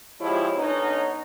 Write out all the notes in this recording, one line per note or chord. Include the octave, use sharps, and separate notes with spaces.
F3 G#3 E4 G4 C#5
D3 B3 C#4 D#4